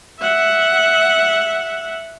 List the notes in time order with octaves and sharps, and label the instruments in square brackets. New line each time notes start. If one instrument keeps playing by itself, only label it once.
[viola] E5 F#5